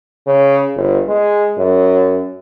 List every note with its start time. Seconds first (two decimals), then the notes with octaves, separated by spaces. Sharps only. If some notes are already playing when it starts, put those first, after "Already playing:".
0.27 C#3
0.75 G1
1.08 G#3
1.58 F#2